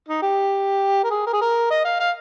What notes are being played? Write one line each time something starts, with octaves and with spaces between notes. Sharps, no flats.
D#4
G4
A#4
G#4
A#4
G#4
A#4
D#5
F5
F5